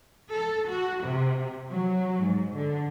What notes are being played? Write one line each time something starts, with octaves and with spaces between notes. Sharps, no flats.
A4
F#4
C3
F#3
G#2
D3